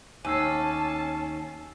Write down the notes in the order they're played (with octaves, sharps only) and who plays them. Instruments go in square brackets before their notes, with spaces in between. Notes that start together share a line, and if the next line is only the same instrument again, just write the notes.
[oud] D#2 [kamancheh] C#4 A5 [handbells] G#5 E6 C7